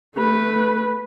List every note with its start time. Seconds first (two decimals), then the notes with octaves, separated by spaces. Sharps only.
0.16 A3 B4